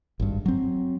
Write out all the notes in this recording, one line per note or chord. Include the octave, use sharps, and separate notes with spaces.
G#1 G2
F#3 C4